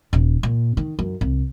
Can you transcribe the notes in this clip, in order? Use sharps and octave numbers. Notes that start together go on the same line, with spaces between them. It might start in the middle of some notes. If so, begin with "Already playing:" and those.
D#1
A#2
D#3
F#2
C2